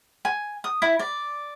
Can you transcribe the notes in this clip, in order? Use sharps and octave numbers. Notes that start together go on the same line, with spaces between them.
G#5
D#6
E4
D5